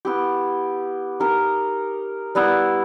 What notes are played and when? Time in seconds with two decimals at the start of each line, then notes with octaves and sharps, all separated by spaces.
0.05 B3 E4 G4
1.20 D#4 G4 A#4
2.35 G3 B3 E4